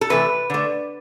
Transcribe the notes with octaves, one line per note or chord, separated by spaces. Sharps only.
A4
C3 E3 A3 B4
D3 A3